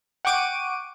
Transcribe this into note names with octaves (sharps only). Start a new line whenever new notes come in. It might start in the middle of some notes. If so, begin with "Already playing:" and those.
F#5 G5 C#6 D6 D7 D#7